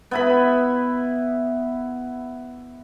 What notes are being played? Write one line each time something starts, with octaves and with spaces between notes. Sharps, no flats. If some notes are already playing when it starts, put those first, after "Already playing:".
B3 E4 B5